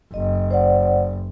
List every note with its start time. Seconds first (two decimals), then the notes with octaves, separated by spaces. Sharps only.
0.14 F#1 D#5
0.51 C5 D5 F#5